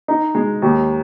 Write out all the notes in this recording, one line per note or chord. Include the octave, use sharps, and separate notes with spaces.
D#4
G#3
D#2